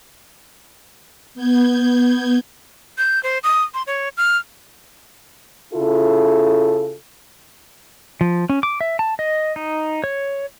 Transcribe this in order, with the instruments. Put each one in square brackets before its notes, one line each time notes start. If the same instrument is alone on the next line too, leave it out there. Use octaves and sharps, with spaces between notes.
[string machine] B3 G6 G#6
[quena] G6
C5
D#6
C6
C#5
F6
[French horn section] C#3 E4 F4 A4
[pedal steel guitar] F3
C#4
D6
E5
A5
D#5
D#4
C#5